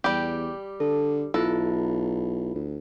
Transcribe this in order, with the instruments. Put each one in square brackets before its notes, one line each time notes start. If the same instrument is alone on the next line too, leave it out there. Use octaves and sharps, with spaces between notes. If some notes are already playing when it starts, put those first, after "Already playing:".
[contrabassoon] E2 [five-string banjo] G3 G4
[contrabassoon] D3 [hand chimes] A4
[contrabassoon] B1 [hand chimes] E4 F4 [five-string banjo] A4
[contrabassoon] D2